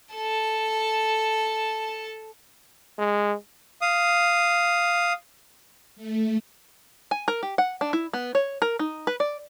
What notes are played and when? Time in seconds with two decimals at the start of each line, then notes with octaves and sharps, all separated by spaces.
0.15 A4 A5
2.99 G#3
3.82 F5 D#6
5.96 A3
7.11 G#5
7.28 A#4
7.43 G4
7.58 F#5
7.81 D4
7.93 E4
8.13 B3
8.35 C#5
8.62 A#4
8.79 D#4
9.07 B4
9.20 D5